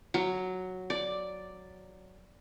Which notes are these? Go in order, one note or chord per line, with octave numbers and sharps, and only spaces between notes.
F#3
D5